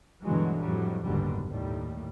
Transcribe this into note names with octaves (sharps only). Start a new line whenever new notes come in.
G2 B2 D3 E3 F#3 G#3
F2 A2 F#3 G3
F#1 D#2 G#2 B2 D3 G3
D#2 A2 D#3 G3